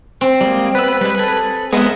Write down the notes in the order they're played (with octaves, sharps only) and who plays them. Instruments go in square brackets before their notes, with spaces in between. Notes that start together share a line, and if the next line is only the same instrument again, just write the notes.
[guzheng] C4
[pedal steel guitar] G3 G#3 A#3
[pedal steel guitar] B3 E6 [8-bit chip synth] B4
[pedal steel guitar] G3 G#3
G#4 A4
[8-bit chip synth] G#3 B3 [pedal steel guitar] G#4 A#4 E5